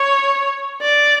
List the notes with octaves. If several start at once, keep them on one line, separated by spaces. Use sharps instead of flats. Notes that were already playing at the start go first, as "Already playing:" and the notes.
Already playing: C#5
D5